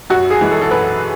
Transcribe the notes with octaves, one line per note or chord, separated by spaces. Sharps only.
F#2 F#4
G#4
E3 G#3
A4
A4
F#2 B4